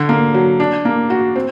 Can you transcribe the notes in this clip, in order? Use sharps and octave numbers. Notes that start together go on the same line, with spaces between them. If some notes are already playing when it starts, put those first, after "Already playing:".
Already playing: D3
A#3
F#3
D4
A#3
F#4
C4